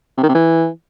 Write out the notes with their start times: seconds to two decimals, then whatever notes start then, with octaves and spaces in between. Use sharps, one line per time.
0.17 C3
0.23 D#3
0.29 C3
0.34 E3